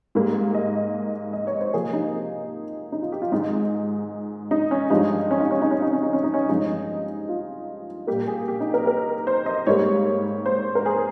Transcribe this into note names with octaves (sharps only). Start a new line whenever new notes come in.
G#2 G3 A#3
D#5
D#5
C#5
C5
C3 F3 A#3 G#4
D#4
D#4
F4
G4
F4
G#2 D#3 G#3 D#4
D#4
C#4
G2 F3 G#3 D#4
C#4
D#4
C#4
D#4
C#4
D#4
C#4
D#4
C#4
D#4
C#4
G2 F3 G#3 D#4
F4
A#2 G3 A#3 G4
G#4
G4
D#4
A#4
A#4
C5
D#5
G#2 G3 A#3 C#5
C5
A#4
G#4